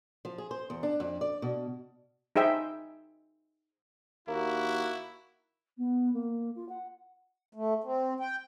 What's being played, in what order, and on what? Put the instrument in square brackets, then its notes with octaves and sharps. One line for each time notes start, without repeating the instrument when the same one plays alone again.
[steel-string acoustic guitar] F3
G#4
C5
E2
D4
F2
D5
B2
[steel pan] D#4 G#4 C5 E5 G5
[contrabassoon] D#2 [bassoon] A#3 [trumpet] E4 [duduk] F#4
[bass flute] B3
A#3
F4
F#5
[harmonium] A3
C4
G5